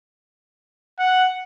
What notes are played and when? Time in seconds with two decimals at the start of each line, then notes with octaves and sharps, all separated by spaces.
0.99 F#5